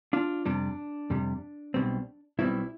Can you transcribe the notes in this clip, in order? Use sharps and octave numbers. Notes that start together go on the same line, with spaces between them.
D4 F4
F2 C3 G3 D4
F2 C3 G3
B1 B2 G3 C4
B1 B2 G3 C4 E4